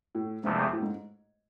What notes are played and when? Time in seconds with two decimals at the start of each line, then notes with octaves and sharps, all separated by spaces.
0.15 A2
0.44 E2 G#2 C3 F3 A3
0.73 A2
0.82 G#2